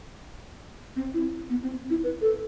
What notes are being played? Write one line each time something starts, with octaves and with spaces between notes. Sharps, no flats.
C4
E4
B3
C4
E4
B4
A4